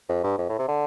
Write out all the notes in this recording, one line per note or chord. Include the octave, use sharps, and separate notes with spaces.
F2
G2
F2
A2
C3
D3